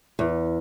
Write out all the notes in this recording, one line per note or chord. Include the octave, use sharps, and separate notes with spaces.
E2